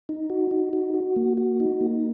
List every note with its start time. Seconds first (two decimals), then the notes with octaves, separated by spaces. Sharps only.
0.09 D#4
0.30 F#4
0.51 D#4
0.73 F#4
0.94 F#4
1.16 A#3
1.37 F#4
1.60 D#4
1.81 A#3